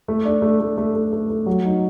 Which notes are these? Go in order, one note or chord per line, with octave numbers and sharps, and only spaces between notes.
A3
D4
A3
A3
A3
A3
A3
A3
F#3
D#4